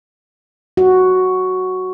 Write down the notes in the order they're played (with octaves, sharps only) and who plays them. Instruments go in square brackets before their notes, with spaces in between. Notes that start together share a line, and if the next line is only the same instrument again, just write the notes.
[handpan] F#4